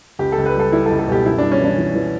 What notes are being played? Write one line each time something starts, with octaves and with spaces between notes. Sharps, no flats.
C#2 G4
A4
C#2
B4
G3
A4
G3 E4
C#2 A4
A4
B2 G4
F#2 E4
G3 D4
C#4
E3 D4
E3
E3